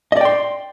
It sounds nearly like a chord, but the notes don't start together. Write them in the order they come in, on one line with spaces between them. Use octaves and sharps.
D#5 D5 G5 C6